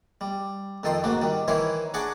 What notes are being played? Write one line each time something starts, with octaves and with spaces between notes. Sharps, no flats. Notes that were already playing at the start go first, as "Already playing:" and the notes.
G3
F2 D#3 A4 G5 C6
G#2 C#3 A#3 F#4
D#3 G3
D#3 E3 E4 A#4 C5 C#5
D4 G#4 F#5 A#5 C#6 D6